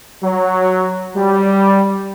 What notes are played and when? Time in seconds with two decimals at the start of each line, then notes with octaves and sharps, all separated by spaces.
0.22 F#3
1.15 G3